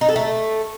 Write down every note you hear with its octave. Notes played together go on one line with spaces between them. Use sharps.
D#4
A4
A3